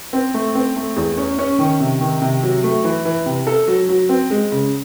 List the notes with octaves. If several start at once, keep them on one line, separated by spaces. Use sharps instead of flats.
C4
A3
C4
A3
E2
C#4
C#4
D#3
C3
D#3
C3
F#3
A3
E3
E3
C3
A4
F#3
F#3
C4
G#3
C#3